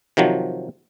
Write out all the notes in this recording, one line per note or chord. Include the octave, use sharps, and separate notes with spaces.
C3 D#3 F3 F#3